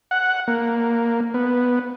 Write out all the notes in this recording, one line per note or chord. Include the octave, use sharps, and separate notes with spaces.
F#5
A#3
B3